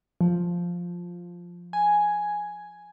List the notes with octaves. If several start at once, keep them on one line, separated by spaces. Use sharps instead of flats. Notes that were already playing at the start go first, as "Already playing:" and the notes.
F3
G#5